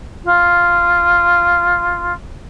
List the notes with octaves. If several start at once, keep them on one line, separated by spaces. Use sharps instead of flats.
F4